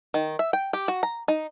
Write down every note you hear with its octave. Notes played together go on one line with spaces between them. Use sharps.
D#3
E5
G5
G4
F#4
A#5
D#4